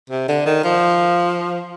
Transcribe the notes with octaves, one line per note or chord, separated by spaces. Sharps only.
C3
D3
D#3
F3